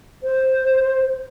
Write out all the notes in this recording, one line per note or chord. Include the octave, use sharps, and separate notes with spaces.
C5